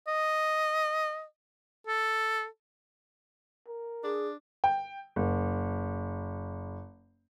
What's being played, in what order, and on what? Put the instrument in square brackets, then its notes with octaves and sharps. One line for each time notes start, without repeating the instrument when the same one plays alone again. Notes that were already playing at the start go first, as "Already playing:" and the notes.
[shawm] D#5
A4
[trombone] A#4
[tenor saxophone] D4 [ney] G#4
[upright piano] G5
F#1